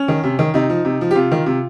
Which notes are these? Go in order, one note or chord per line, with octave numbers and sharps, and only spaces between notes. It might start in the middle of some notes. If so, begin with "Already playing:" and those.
Already playing: C#4
D#3
C3
D#3
C3 D#4
F3
C3
F3
G4
C3 F4
D#3
C3